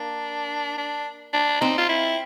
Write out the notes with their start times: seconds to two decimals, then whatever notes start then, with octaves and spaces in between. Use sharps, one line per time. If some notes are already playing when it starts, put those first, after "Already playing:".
Already playing: A#3 D4
0.78 D4
1.33 D4
1.61 C4 D#4
1.78 F4
1.89 E4